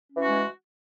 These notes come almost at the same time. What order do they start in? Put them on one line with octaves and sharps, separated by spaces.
C#4 E3 F#4 G#3